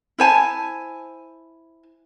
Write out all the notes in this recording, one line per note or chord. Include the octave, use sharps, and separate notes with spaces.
E4 C5 G#5 A5